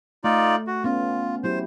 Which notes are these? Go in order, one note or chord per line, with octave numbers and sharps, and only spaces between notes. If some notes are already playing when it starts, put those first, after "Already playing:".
A3 D#4 F4 D5
F#4
B3 C#4 F4
F#3 E4 G4 C5